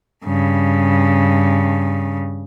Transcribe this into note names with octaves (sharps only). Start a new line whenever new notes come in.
G2 C#3